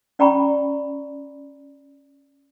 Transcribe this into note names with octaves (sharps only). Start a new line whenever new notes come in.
C#4 D5 G5 A#5 B5 C#6